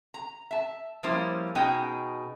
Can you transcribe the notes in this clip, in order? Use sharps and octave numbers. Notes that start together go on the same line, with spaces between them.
A#5
E5 A5
F3 G3 A#3 C#4 E4 C5
B2 C#4 D#4 G#4 D#5 G5